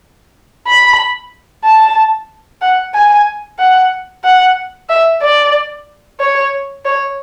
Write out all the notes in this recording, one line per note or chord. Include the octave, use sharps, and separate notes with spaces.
B5
A5
F#5
G#5
F#5
F#5
E5
D5
C#5
C#5